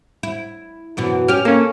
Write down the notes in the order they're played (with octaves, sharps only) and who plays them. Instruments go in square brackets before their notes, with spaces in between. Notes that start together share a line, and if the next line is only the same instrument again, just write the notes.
[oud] E4
F#2 B2 E3
[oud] C#4 G4 [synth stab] F6
[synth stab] A#3 C#4 [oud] A4